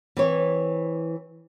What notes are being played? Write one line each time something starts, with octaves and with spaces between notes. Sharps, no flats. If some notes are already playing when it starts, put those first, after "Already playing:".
E3 C4 C#5